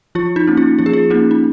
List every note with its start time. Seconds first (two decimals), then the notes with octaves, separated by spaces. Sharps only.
0.15 F3 F4
0.36 D#4
0.47 A#3 C#4
0.57 F4
0.79 F3 F4
0.86 G#4
0.93 F4
1.10 A#3 C#4 D#4
1.31 D#4